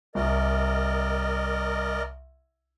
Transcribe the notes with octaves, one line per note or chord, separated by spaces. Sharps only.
C2 A#4 D5 D#5